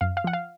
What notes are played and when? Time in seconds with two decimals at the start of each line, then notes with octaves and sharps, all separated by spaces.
0.01 F#2 F5
0.17 F5
0.24 F3 F#5
0.33 F5